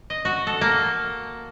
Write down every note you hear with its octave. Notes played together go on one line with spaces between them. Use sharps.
D#5
F#4
A4
A#3